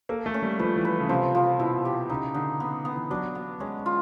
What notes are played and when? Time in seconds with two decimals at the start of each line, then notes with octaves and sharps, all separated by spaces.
0.09 A#3 A4
0.26 A3
0.34 C#4
0.42 G3
0.59 F3 B4
0.76 E3
0.85 B4
1.00 C#3
1.09 C3 F3
1.35 F3
1.60 B2 E4
1.85 G4
2.10 C#3 D#4
2.34 D3 D#4
2.60 B3
2.85 B3
2.94 E3
3.10 F#3 D4
3.35 B3
3.60 G#3 C#4
3.86 F4